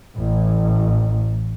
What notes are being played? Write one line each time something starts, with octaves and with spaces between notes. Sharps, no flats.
A1